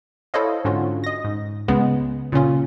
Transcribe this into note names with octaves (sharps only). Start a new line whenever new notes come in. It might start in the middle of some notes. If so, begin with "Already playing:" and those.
E4 A4 C5 C#5 D#5 F5
G#2 D3 C#4 F4 F#4
D#5 A#6
G#2
C#2 C#3 G#3 B3
A#2 C#3 C#4 F4